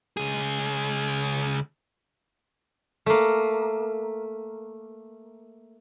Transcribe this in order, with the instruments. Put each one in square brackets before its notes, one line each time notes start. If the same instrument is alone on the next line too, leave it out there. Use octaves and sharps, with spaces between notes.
[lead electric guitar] C#2 G#4
[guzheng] A3 A#3